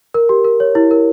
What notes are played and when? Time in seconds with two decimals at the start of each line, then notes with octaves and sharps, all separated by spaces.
0.14 A#4
0.29 G4
0.45 A#4
0.60 C#5
0.75 E4
0.91 A#4